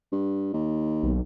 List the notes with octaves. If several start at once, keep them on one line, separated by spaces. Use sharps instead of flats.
G2
D#2
B1